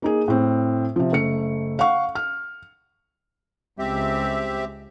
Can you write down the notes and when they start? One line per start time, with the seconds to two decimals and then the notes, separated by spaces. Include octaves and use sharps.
0.02 A#3 D#4 G#4
0.28 A2 C4
0.96 C3 F3
1.12 F#1 A3 C#7
1.79 F5 F#5 C#6
2.15 F6
3.79 C#2 C4 G4 E5